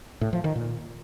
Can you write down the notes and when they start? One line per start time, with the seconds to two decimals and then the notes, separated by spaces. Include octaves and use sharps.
0.21 A2
0.33 F3
0.44 D#3
0.56 A#2